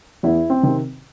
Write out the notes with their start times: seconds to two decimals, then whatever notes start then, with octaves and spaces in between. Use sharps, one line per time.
0.23 E2 E4
0.50 C4
0.63 C3 D#3